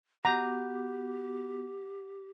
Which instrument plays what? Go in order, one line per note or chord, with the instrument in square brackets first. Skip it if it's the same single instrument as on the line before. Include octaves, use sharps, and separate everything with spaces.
[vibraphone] B3 F#4 [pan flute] G4 [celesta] F#5 D6 G6 [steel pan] A#5